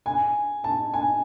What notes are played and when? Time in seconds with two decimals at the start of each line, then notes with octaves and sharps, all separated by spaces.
0.06 G#5
0.64 A5
0.94 G#5